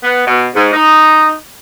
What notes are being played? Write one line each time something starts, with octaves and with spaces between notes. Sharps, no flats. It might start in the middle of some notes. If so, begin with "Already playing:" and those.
B3
B2
G#2
D#4